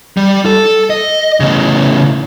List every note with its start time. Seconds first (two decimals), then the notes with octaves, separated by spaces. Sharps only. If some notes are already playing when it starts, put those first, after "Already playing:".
0.17 G3
0.46 A4
0.90 D#5
1.40 A2 C#3